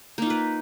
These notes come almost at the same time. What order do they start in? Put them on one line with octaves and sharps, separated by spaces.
A#3 D#4 F4 B4